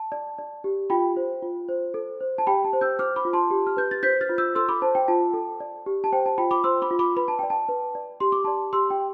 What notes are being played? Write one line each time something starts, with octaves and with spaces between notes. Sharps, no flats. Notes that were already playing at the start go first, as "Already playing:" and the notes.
Already playing: A5
D5
D5
G4
F4 G5 B5
C5
F4
C5
A4
C5
A5
G4 G5 B5
A5
C5
E6 G6
C5 D6 F6
B5 D6
F4
A5 C6
G4
F6
B4 G6
A6
C5 G6 B6
F6 A6
F4
E6 G6
A4 C6 E6
B5 D6
C5 A5
G5
F4 A5
A4
D5
G4
A5
C5 G5
A5
F4 G5 B5
B5 D6
C5 C6 E6
B5 D6
F4
B5 D6
B4 B5
A5
D5 G5
A5
B4
D5
G4 C6
D6
D5 A5 C6
G4 C6 E6
G5